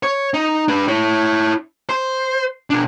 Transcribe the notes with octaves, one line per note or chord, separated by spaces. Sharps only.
C#5
D#4
D4 B4
E4 C#5
C5
B2 D4